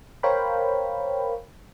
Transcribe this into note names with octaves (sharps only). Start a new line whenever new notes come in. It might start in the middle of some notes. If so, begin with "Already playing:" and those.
A#4 C5 C#5 F5 G5 B5